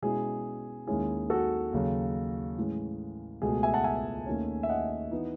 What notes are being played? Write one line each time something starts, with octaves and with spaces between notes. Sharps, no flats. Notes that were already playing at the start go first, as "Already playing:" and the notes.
B2 G#3 C#4 E4 G#4
D#2 D#3 G#3 C#4 E4 G#4
F#4 A4
D#2 C#3 F#3
A2 E3 G#3 C#4
C#2 B2 A3 G#4
E5 G#5
F#5 A5
E5 G#5
D#2 D#3 A3 C#4
E5
D#5 F#5
E3 B3 D#4